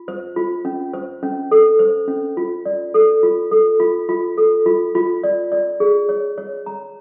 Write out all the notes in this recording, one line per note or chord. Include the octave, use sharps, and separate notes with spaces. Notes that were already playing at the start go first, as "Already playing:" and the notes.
Already playing: F4
C5
F4
C#4
C5
C#4
A4
C5
C#4
F4
D5
A4
F4
A4
F4
F4
A4
F4
F4
D5
D5
G#4
C#5
C#5
A#5